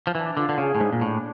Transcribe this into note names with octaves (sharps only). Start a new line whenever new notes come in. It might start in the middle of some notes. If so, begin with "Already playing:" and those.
F3
E3 D4
D3 F4
D3
C#3 G#4
A2
G#2 D4
A#2
A2 D4